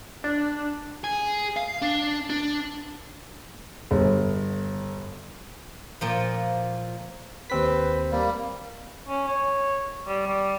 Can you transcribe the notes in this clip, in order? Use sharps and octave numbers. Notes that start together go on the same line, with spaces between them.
D4
G#4
F5
D4
D4
G1
A#2 F3
D#2 C4 B4 B6
G3 A#3
C#4
C#5
G3
G3